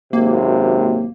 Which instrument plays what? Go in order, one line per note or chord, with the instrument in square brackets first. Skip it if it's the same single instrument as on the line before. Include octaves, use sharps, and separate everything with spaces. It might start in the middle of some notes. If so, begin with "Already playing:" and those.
[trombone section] G#1 F#2 C3 [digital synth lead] A#3